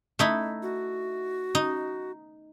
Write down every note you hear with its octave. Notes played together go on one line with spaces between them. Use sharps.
A3 D#4 E4
F#4
D#4